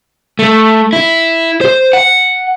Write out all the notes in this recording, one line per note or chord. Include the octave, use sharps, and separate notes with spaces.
A3
E4
C5
F#5